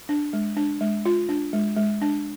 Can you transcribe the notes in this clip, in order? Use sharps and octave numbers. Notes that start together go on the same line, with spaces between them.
D4
G#3
D4
G#3
F4
D4
G#3
G#3
D4